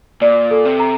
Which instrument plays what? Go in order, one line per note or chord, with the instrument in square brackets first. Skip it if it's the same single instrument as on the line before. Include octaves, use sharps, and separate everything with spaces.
[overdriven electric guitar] A#2 [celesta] D5
[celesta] A4
[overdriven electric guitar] C3
[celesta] A#5